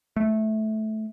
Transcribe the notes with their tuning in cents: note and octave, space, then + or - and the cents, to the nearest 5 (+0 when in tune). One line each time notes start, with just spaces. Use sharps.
A3 -15